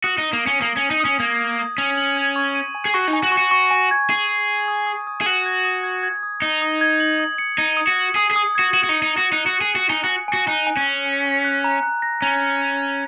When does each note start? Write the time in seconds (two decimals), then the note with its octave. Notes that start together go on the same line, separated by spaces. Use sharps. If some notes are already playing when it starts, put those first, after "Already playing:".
0.04 F#4 D#6
0.18 D#4
0.23 D#6
0.33 A#3
0.43 C#4 D#7
0.61 A#3 D#6
0.77 C#4
0.82 F#7
0.91 D#4
1.00 C#4 D#6
1.20 A#3 G#6
1.39 D#6
1.59 D#6
1.77 C#4 F#7
1.98 F#7
2.17 G#6
2.36 C#6
2.55 D#7
2.75 G#5
2.85 G#4
2.94 F#4 C#6
3.08 D#4
3.13 G#5
3.23 F#4
3.32 C#6
3.37 F#4
3.51 C#6
3.71 G#5
3.91 G#6
4.10 G#4 C#6
4.29 D#7
4.49 D#7
4.68 D#6
4.87 D#6
5.07 D#6
5.21 G#4
5.26 F#4 D#6
5.46 G#6
5.65 D#6
5.83 G#6
6.03 G#6
6.23 D#6
6.42 D#4 D#6
6.62 D#6
6.81 G#6
7.00 F#7
7.20 D#6
7.38 C#7
7.58 D#4 G#6
7.77 D#6
7.87 F#4
7.96 F#7
8.15 G#4 D#6
8.31 G#4 D#6
8.55 F#4 G#6
8.74 F#4 C#7
8.84 F#4
8.89 D#4 F#7
9.02 D#4
9.12 C#7
9.18 F#4
9.32 D#4 F#6
9.46 F#4 C#7
9.61 G#4
9.70 C#7
9.76 F#4
9.89 D#4 G#5
10.04 F#4
10.09 G#5
10.28 G#5
10.33 F#4
10.48 D#4 F#6
10.67 G#5
10.77 C#4
10.87 G#5
11.06 G#5
11.26 G#5
11.45 F#6
11.64 A#5
11.83 F#6
12.02 A#6
12.22 C#4 A#5